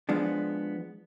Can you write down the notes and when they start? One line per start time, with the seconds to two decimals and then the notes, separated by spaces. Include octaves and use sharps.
0.09 F3 G#3 B3 D4